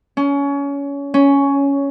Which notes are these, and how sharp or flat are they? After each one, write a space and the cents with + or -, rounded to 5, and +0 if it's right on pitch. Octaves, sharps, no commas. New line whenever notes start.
C#4 +25
C#4 +10